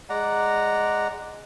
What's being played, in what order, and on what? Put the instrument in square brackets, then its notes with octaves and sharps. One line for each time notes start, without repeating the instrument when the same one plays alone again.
[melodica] G#3 D5 F#5 A#5